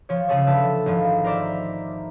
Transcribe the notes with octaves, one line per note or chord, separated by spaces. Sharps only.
F3 C#5
C#3 F3 G#4 A4 C#5
D3 B4 E5 A5
G#1 F3
A#4 C5 D5 E5